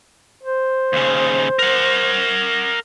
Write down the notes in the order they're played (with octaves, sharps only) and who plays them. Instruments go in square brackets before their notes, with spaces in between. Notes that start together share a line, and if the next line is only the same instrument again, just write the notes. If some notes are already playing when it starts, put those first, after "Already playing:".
[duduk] C5
[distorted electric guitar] D#2 C#3
A#4 F#5